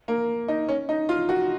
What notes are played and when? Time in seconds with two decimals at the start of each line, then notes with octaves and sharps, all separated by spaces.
0.08 A#3
0.48 D#4
0.68 C#4
0.89 D#4
1.09 F4
1.29 F#4